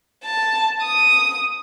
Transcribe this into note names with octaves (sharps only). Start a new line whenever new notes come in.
A5
D#6